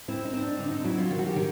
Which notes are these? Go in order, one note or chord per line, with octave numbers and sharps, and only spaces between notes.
C4 E4
D#4
C4
D4
D3 D#4
D#4
F#3 E4
F4
D#3
F#4
G4
D#3